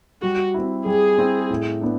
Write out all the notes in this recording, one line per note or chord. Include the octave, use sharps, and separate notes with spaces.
G3 F#4
C4 E4
G3 G#4
C4 E4
A2
B3 D4